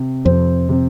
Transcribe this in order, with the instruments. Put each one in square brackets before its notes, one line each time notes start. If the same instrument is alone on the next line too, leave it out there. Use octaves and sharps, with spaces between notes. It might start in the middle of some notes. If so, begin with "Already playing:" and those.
Already playing: [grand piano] C3
[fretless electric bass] F2 [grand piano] C4
[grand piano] C3